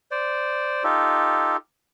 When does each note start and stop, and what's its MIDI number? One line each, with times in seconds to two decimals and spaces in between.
0.11 0.83 72
0.11 0.83 74
0.84 1.56 63
0.84 1.56 65
0.84 1.56 67
0.84 1.56 69